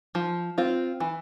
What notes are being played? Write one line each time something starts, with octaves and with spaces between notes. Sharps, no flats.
F3
C4 F4
E3